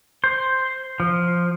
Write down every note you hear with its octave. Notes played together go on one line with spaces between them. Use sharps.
C5
F3